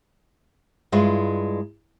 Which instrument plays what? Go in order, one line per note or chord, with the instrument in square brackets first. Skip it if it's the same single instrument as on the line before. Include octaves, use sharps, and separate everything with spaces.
[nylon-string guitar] G2 G#3 E4 F4